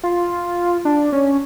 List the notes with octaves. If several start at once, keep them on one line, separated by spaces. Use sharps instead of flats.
F4
D4
C#4